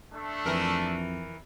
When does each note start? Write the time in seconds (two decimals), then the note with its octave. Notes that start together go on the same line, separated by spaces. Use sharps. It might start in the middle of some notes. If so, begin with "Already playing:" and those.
0.13 A3 D4
0.46 F2 E3 A#4